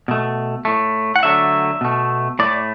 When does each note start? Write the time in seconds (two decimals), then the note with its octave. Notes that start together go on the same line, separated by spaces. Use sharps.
0.08 B2 A3
0.65 A2 A3
1.16 F#5
1.23 D3 F#3 A3 E5
1.81 B2 A3
2.39 A2 A3 D5